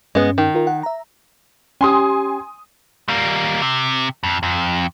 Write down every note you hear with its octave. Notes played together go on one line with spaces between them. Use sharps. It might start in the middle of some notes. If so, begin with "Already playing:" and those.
G2 G#3 B3 C#4
D#3
F4 A#4
F#5
E5 A#5
C#4 G4 G#5 C6 D#6
G3 A#3
C3
F2
F2